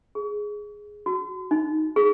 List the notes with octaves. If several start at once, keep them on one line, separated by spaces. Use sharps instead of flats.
G#4
F#4
D#4
G#4